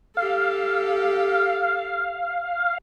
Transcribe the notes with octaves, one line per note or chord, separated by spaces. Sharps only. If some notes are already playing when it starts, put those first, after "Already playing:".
G4 A4 F5